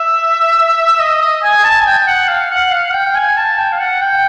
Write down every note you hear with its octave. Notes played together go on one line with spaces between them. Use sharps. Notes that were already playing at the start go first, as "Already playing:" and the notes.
Already playing: E5
D#5
D#5
D#5
G#5
A5
G#5
G5
G5
F#5
F5
F#5
F5
G5
G#5
A5
G5
F5
F#5
G5